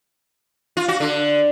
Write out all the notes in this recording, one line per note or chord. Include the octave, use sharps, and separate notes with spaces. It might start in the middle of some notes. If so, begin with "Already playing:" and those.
F4
F#4
D3